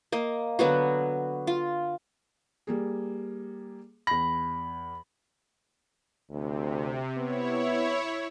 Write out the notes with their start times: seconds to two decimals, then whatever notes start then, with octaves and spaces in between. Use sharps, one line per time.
0.12 A#3 D#5
0.59 D3 F#3 B3 F#4
1.47 F4
2.67 G3 A#3 G#4
4.07 E2 B5 A#6
6.30 D2 C3
7.18 B3 E4 C#5